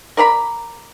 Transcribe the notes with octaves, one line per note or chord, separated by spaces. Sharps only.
A#4 D5 A#5 B5